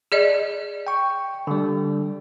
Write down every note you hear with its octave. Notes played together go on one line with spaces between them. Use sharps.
G#4 D5 D#5
G5 C#6
D3 G3